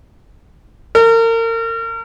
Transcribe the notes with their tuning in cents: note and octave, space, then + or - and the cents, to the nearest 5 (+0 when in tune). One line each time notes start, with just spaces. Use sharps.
A#4 -35